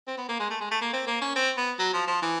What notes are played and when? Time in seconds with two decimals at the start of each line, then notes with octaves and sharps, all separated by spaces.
0.07 C4
0.18 B3
0.29 A#3
0.40 G#3
0.50 A3
0.61 G#3
0.71 A3
0.82 A#3
0.93 C4
1.07 A#3
1.21 C#4
1.36 C4
1.57 B3
1.79 F#3
1.93 F3
2.08 F3
2.22 E3